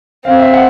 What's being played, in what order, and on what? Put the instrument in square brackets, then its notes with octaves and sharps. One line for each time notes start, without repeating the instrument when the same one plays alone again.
[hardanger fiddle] C4 [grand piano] F5
[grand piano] E5
F#5